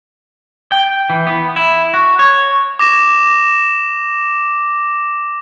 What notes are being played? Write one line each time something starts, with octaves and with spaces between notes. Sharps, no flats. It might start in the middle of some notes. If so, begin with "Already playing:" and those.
G5
E3
B3
E4
F#4
C#5
D6 A#6 E7